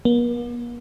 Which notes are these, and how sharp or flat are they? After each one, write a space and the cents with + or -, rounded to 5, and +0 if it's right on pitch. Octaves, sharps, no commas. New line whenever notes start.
A#3 +45